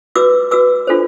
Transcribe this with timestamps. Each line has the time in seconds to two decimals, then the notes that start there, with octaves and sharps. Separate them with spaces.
0.15 F#4 B4 D6 E6
0.51 F#4 B4 D6 E6
0.87 D4 F4 A4 C5